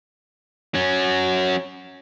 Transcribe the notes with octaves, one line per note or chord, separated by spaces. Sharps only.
F#3 C#4